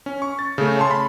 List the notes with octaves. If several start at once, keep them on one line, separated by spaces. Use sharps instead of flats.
C#4
C#6
A6
C#3 A3
C#5 A5 C6
B5